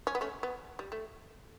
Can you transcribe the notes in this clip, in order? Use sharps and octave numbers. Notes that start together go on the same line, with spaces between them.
C#4
B3
A3 C#4
B3
G3
A3